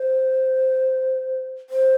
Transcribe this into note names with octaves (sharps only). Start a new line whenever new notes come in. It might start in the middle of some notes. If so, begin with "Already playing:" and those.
Already playing: C5
C5